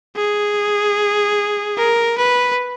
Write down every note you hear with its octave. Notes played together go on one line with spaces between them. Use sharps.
G#4
A#4
B4